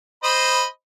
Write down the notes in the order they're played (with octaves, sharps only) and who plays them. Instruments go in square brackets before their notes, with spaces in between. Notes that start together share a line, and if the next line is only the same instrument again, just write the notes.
[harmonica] C5 D#5 B5